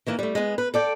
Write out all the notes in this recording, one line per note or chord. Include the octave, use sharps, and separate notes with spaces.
D#3 E3 A#3
G3 A3
G#3 B3
B4
A4 D5 G5